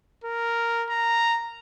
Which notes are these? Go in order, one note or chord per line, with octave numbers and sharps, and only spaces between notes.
A#4
A#5